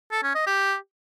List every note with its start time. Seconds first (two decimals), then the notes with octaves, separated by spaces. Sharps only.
0.12 A4
0.23 C#4
0.35 D#5
0.47 G4